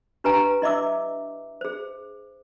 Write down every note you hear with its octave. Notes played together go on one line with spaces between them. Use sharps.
D4 G4 B4 G5 G#5 A#5
E4 D#5 E5 D6 E6
G#4 C5